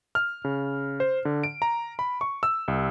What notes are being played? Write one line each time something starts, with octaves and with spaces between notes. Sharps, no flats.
F6
C#3
C5
D3
D7
A#5
B5
C#6
E6
C2